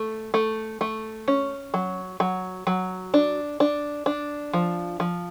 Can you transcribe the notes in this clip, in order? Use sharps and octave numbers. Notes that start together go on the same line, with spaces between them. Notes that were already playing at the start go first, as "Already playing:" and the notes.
Already playing: A3
A3
A3
C#4
F#3
F#3
F#3
D4
D4
D4
F3
F3